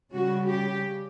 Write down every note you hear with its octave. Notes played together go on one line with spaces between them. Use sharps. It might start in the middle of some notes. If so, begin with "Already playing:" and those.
C#3 G3 C#4 F#4
G4